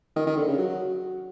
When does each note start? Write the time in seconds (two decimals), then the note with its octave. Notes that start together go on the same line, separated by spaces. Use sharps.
0.16 D#3
0.27 D#3
0.37 D3
0.48 C#3
0.58 F#3